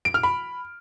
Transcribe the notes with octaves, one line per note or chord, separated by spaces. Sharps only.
D7
F6
B5